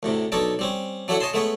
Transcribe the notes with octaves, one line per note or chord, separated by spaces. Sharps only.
D2 A2 C3
B1 D4 D#4 A4 C#5 D6
G3 C4 C#4
F#3 D4 E4 A4 C#5 F#5
C#5 D#5 G#5 A5 C6
G#3 A3 B3 B4 C#5